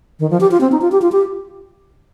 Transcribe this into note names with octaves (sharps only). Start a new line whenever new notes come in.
D#3
F3
G4
F4
C4
D#4
F4
G4
F4
G4